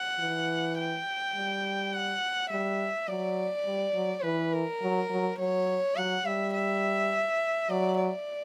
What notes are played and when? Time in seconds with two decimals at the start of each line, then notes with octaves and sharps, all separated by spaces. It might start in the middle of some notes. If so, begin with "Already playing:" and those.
Already playing: F#5
0.19 E3
0.78 G5
1.35 G3
1.93 F#5
2.50 G3 E5
3.08 F#3 D5
3.66 G3
3.94 F#3
4.23 E3 B4
4.53 A#4
4.82 F#3
5.10 F#3
5.39 F#3 C#5
5.96 F#3 F#5
6.25 G3 E5
6.54 E5
7.70 F#3 D5
7.98 D5